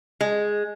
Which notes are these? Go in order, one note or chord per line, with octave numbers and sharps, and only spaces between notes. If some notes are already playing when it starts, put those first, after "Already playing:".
G#3